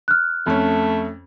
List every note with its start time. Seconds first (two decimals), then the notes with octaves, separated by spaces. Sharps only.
0.08 F6 F#6
0.46 F2 A3 C#4